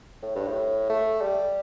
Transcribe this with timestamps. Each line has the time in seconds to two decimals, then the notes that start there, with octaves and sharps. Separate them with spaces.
0.23 A2
0.36 G2
0.49 A2
0.90 A3
1.22 G3